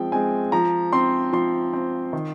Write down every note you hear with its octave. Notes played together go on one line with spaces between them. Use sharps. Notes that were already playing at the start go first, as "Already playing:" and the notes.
Already playing: F3 G#3 C4 G5
G#3 C4 G#5
F3 A#5
C4 C6
F3 C6
C4
D#3